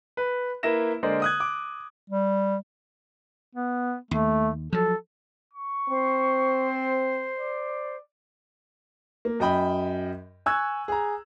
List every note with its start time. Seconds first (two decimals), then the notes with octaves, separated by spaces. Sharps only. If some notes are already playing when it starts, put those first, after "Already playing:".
0.17 B4
0.63 A#3 E4 B4 A#6 E7
1.03 D3 G#3 A#3 A#4 C5 D5
1.22 D#6 F#6 G#6
1.40 D6
2.10 G3
3.55 B3
4.11 D#2 A3
4.73 F3 F#3 A4
5.53 C#6
5.89 C4 C5
7.39 D5
9.25 A#3
9.40 F#2 D#5 G5 B5
10.46 G#5 C#6 E6 F#6 G#6
10.88 G#4 A#5